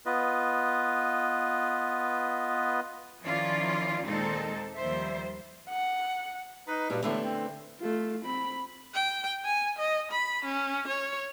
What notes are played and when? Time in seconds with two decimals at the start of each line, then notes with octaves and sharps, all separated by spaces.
0.06 B3 F4 B4 D#5
3.22 D#3 F3 C#4 E4 F4 D5
4.05 D#2 A#2 G#3 C4 D#4 A4
4.76 D#2 F3 G3 C5 E5
5.70 F#5
6.68 D#4 B4
6.90 G2 A#2 F#4
7.03 A2 D3 E3 A3 B3
7.24 C4
7.81 A3 F4
8.25 C4 B5
8.94 G5
9.44 G#5
9.78 D#5
10.11 B5
10.45 C#4
10.87 C#5